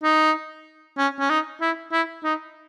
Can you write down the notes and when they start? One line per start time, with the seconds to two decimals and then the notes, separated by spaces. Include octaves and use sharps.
0.03 D#4
0.98 C#4
1.19 C#4
1.30 D#4
1.61 E4
1.92 E4
2.24 D#4